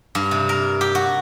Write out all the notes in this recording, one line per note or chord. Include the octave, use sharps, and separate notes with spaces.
G2
C3
A#4
G4
F#4